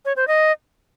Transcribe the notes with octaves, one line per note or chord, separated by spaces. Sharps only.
C#5
C5
D#5